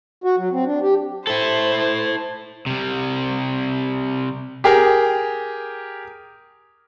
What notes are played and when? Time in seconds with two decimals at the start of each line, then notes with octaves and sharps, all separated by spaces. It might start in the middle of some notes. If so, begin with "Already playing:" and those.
0.24 F#4
0.38 F#3
0.52 C4
0.66 D4
0.82 G4
1.27 E4 A4 C5
2.66 C3 G3
4.64 G4 G#4 A#4